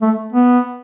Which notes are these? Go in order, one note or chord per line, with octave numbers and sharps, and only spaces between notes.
A3
B3